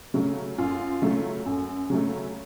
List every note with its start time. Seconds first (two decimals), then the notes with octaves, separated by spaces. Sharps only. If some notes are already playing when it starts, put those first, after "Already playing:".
0.14 C#3 F#3 A3
0.58 F#2 F4
1.02 C#3 F#3 A3
1.46 F#2
1.90 C#3 F#3 A3